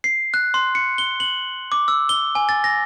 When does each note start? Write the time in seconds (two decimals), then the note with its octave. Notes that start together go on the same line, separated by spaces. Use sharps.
0.04 C7
0.34 F#6
0.54 C6
0.75 C#7
0.98 G7
1.20 F#7
1.72 D6
1.88 E6
2.09 G7
2.35 G#5
2.49 A6
2.64 A#6